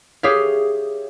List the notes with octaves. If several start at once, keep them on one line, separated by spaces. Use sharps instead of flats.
G4 G#4 C#5 E5 F5